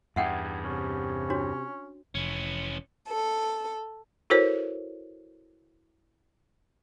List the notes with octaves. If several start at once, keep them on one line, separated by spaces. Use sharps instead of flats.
E2 G2 E5 F#5 G5
C3 C#4
D4 F#4 C#5
F1 E3 C#4
A4
E4 F#4 A4 A#4 C5 C#5